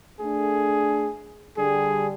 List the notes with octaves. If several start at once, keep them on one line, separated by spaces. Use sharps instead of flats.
A3 D4 G#4
D3 G3 G#4